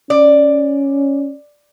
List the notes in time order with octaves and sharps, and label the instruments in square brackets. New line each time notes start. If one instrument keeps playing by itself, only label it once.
[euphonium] C#4 [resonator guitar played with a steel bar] D5